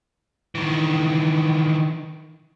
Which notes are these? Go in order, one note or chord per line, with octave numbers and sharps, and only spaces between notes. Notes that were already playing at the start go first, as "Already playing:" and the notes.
D#3 E3